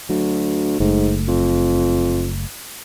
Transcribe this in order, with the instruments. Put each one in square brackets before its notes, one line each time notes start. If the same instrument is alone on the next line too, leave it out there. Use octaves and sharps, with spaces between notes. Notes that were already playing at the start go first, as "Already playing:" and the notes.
[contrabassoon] D2 [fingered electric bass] F#3
[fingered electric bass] F#1 A3 [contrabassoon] G#2
[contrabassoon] F2